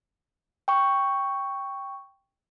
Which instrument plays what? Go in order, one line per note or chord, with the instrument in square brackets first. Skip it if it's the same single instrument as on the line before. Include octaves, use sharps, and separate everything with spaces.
[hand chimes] G5 C#6